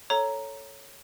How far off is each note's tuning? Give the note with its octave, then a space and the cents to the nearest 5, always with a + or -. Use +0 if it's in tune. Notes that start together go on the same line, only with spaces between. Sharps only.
A4 +0 C#5 +0 A#5 +0